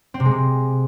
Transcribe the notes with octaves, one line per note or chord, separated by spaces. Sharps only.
C4
C3
G#3
C3